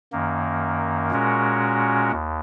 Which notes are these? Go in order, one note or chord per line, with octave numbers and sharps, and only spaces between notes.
F#2 D#3 A#3
A#2 G#3 C#4 F#4 A#4
D#2